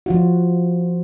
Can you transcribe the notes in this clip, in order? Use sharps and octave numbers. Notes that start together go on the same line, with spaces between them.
F3 F4 F#4